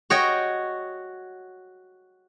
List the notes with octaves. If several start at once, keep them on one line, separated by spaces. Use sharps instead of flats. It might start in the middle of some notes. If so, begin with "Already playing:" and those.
F#4 C#5 D#5 G5